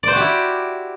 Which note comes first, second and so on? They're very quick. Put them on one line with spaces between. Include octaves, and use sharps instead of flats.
D5 C5 F#4 G4 E4